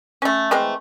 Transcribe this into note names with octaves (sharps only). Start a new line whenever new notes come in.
A3 C#4
E3 G#3 A3 C4